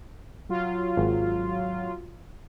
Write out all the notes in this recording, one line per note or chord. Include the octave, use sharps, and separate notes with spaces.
F#3 F4
G#1